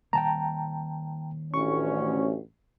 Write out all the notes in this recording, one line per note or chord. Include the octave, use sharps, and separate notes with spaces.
D#3 G3 A#3 G5 A5 A#5
A1 D2 C#4 C#6